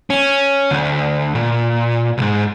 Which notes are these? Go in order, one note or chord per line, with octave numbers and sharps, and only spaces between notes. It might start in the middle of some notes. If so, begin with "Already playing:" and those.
C#4
D2
A#2
C2 G#2